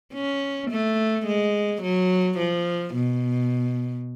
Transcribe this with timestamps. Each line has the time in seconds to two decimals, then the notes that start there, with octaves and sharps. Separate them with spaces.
0.14 C#4
0.71 A3
1.26 G#3
1.82 F#3
2.38 F3
2.94 B2